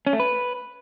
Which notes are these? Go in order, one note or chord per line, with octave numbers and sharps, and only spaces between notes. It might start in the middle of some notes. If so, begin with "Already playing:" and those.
C#4
A3
B4